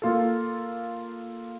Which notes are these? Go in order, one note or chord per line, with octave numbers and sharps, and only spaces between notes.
A#3 F4 A4